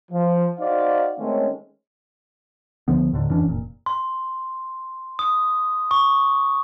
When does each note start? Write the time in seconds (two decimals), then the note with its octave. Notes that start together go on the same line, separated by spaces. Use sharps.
0.12 F3
0.59 D#4 F#4 C5 D5 F5
1.19 D#3 G#3 A3 C4 C#4
2.88 C#2 D3 F3 B3
3.12 D#2 A2 D3 D#3
3.29 F2 E3 C#4 D4
3.45 F1 A#2
3.86 C6
5.19 D#6
5.91 C#6